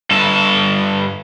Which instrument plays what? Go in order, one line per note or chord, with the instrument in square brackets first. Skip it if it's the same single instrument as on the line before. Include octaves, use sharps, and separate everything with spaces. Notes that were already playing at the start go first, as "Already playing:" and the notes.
[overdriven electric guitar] G2 A4